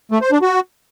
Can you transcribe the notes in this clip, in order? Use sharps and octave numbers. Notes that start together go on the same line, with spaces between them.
A3
C5
D4
F#4